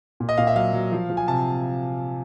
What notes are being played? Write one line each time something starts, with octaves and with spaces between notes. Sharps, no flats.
A#2
D#5
A#2 F5
E5
F#3 F5
F#3
F3
F3
G#5
C3 A5